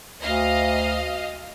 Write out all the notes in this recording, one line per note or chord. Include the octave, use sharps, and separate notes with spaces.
D2 D#5 F5